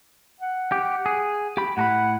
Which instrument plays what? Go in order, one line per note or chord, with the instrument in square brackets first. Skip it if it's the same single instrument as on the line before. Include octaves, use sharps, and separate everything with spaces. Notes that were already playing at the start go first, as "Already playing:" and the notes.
[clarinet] F#5
[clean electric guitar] G4
G#4
G4 B5
[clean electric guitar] A2 A#5 B5 [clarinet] F#5